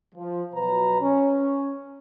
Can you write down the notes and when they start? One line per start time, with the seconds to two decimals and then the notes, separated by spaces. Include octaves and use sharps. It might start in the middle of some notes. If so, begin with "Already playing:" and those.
0.14 F3
0.54 B2 F#3 B4 A#5
1.00 C#4